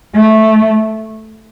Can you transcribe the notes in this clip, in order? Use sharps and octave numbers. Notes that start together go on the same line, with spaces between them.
A3